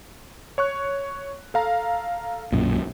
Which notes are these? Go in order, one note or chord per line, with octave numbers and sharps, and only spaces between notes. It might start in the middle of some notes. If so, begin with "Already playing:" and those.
C#5 C#6 F#6
A4 F5 A#5
B1 F#2 A#2